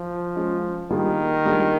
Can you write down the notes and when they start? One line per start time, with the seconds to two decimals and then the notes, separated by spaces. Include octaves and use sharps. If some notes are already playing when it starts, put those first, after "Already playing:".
Already playing: F3
0.35 G#3 C#4 F4 G#4
0.90 D#3 G3 A#3 D4 F4 G#4
1.45 G3 A#3 D4 F4 G#4